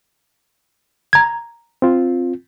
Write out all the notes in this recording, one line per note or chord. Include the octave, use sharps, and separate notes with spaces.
A#5 G#6
C4 F4